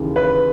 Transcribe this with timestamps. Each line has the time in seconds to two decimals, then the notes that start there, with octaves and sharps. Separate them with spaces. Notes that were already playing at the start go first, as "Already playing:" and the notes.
Already playing: D#2 C#3 E3
0.16 B4